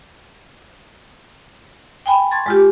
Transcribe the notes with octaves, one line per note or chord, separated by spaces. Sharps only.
G5 G#5 B5
A5 C6 C#6 G#6 A6
G#3 F4 G4